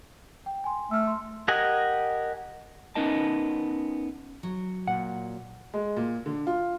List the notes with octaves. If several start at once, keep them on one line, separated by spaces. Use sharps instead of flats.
G5
G#5 C6
A3 E6 F6
C6
G4 A#4 D#5 F#5 G#5
B3 C#4 D#4 A#4 D#5 A5
F#3
A#2 F#5
G#3
A#2
D3
F4